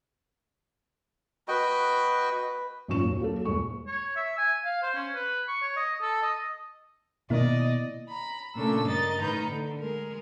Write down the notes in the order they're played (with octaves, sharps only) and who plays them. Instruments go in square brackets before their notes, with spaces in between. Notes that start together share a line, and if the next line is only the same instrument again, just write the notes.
[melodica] F#4 D#5 G5 [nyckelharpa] B4
[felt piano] G#1 F#2 A#2 C#6 E7
D#2
F#3 A#3 A4
D#1 G#3 C#6
[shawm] C#5
E5
G#5
F5
C5
C#4
B4
C#6
C#5
D#5
A4
D#5
[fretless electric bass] B2 [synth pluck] D#3 A#3 E4 [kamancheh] D5 D#5
[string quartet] A#5 B5
A#2 C#3 A3 D4 A4 E6
G2 G3 A#4 D#5 A6
A2 D#3 D#4 B4 A#5 G6
D3
G#3 A#4